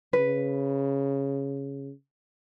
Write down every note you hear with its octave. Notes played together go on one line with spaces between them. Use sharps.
C#3 B4